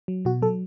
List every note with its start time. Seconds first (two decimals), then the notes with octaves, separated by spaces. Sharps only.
0.08 F#3
0.25 B2 F#4
0.42 F#3 A4